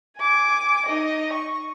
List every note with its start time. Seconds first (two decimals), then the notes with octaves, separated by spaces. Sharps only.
0.18 G#5 D6
0.86 D#4 D#5
1.33 C#6